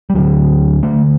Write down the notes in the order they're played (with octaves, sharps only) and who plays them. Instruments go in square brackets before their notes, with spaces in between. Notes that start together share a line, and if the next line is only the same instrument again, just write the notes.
[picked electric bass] G3
D2 D3 F#3
D2 D3 A3